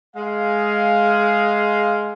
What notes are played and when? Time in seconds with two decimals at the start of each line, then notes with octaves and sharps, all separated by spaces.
0.16 G#3 F5